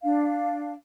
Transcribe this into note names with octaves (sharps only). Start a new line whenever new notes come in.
D4 F5